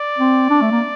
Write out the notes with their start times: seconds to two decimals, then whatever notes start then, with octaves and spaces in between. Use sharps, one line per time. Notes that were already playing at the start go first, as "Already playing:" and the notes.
Already playing: D5
0.18 C4
0.50 D4
0.62 A3
0.71 A#3